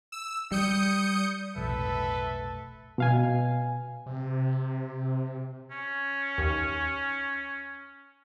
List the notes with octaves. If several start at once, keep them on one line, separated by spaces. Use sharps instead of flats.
E6
G3 D#6 G6 C#7
F1 B1 A2 A4 B4 E5
B2 F5 G#5
C3
C#4
D#2